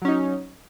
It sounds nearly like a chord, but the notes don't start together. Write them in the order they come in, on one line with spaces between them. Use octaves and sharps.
F#3 C#4 D#4